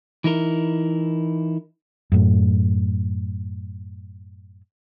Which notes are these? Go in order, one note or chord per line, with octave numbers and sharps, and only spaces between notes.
E3 D#4 E4 A#4
F#2 A2